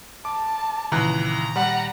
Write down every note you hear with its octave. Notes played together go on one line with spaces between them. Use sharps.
A5 D6
C#2 A#2 D#3 E3 A#5 F#6
G3 F#5